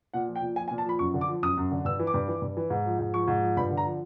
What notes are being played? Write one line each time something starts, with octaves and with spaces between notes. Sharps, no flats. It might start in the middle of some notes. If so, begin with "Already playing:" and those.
A#2 F#5
F3
G5
A#2
F3 G#5
G#5
A#2
A5
F3 B5
F#2 C#6
D3
D6
F3
F#2 D#6
F#2
D3
G2 E6
E3
D6
G2
E3
G2
E3
G#2
F3
G#2
F3 C#6
G#2
F3
G2 B5
D3
A#5
F3